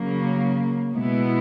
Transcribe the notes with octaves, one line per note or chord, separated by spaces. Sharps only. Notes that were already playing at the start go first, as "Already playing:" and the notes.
Already playing: C#3 F#3 A#3
B2 G#3 B3 E4